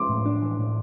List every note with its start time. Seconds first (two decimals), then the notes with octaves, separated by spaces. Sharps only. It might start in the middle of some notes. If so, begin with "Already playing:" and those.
Already playing: C6 D6
0.09 A2
0.26 D4
0.42 E3
0.59 A2